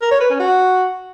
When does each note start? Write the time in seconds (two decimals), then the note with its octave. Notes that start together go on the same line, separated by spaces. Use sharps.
0.02 A#4
0.11 C#5
0.21 B4
0.30 C#4
0.40 F#4